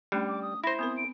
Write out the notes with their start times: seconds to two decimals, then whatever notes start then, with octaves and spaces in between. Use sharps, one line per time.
0.12 G3 A3 C#4 D4
0.28 D6
0.42 D#6
0.64 E4 C5 B5 A#6
0.79 B3 C4 A#4 D#6
0.97 D7